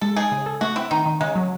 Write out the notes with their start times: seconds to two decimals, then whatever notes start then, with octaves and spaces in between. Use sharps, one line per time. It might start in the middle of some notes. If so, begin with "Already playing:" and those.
0.01 G#3 A4
0.16 D#4 G#4
0.32 C#3
0.46 A4
0.61 A3 F#4
0.76 C4 E4
0.91 D#3 D#4
1.06 D#3
1.21 C#3 G#3
1.35 F#3